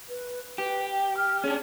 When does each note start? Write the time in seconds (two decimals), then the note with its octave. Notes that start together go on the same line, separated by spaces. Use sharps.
0.09 B4
0.58 G4 B4
0.86 G5
1.17 F6
1.44 C#4 D4 G#4